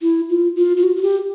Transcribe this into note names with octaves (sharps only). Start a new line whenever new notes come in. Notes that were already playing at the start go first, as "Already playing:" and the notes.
E4
F4
F4
F4
F#4
F#4
G4